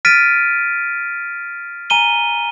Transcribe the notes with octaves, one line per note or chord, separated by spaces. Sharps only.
F6 A6 B6 D7 D#7
G#5 A#5 D#7 G7